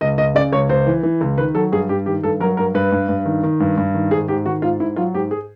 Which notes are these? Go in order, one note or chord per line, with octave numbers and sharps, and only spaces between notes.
C#2 D#5
C#2 D#5
C#3 D5
C#2 C#5
C#2 C5
E3
E3
C#2
D#3 B4
F#3 A4
G2 G#4
G2 G4
D#3 G4
G2 A4
F#3 A#4
G2 A#4
G2 B4
G2
G2
D#3
D#3
G2
G2
D#3
G#2 G#4
G#2 G4
D#3 F#4
G#2 F4
G#2 E4
F#3 F4
G#2 G4
G#4